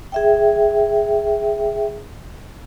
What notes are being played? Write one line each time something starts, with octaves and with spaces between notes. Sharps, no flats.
G#4 E5 G5